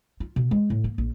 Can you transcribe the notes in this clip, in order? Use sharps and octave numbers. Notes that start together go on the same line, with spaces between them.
F4
B2
G#3
A2
A#3
A#1